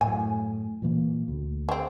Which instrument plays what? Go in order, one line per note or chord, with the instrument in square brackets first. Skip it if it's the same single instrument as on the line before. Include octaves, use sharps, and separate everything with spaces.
[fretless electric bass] F#2 A2 [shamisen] G#5
[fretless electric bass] A#2 E3 A#3
D2
[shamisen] G#3 C4